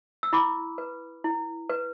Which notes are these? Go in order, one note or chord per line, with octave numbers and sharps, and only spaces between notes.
E6
E4 B5 D6
B4
E4
B4